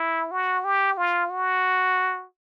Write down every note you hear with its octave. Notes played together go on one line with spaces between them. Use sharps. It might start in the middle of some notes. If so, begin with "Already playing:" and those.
Already playing: E4
F#4
G4
F4
F#4